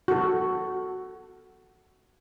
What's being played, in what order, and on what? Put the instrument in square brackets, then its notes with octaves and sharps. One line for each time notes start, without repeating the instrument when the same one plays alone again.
[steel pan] F#4 A4